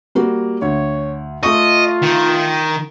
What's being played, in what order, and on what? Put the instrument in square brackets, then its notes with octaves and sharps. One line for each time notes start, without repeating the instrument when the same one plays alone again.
[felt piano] G3 A#3 F#4
[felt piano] D2 [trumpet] C#5
[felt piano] A3 C#6 [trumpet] F4 [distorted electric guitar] D#5
[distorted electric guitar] D#3